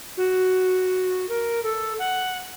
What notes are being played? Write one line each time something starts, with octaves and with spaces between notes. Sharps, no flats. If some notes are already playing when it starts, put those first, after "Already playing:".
F#4
A#4
A4
F#5